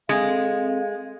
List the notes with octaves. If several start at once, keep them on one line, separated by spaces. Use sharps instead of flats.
G#3 C4 A4 F5